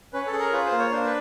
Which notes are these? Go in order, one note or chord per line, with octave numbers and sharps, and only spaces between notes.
C#4 B4
A4
G#4
A#4
F4 B4
C5
A#3
C#5
D4 C5
B4